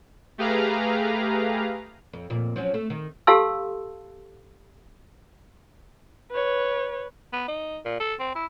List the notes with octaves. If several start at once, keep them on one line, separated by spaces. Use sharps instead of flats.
A3 G4 G#4 B4 F5 A#5
F2
F2 A#2
F3 F#3 C#4
A3
D#3
G4 A4 F5 A5 C6 E6
B4 C#5
B3
D#4
A#2
A4
C4
E4